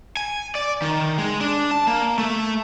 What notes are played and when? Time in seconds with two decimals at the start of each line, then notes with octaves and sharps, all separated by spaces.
0.17 G#5
0.55 D5
0.82 D#3
1.18 G#3
1.41 D4
1.71 A5
1.87 A#3
2.18 A3